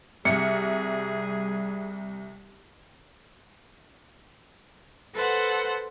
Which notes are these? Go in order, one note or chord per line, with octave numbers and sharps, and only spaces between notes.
C2 G3 G#4 C#7
A4 B4 C5 F#5